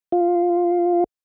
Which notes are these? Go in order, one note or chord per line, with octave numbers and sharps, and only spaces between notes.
F4